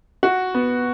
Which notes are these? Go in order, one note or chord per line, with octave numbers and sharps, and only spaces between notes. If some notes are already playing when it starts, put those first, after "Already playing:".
F#4
B3